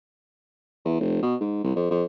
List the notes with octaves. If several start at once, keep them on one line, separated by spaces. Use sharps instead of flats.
E2
F1
B2
G#2
C2
F2
F2